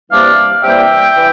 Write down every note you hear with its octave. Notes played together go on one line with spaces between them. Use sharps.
C3 E3 G3 A#3 D4 D5 F5
C3 E3 G3 A#3 D4 E5 G5
E3